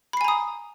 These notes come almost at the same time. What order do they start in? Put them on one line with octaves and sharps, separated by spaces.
B5 C7 G#5 A#5 D#6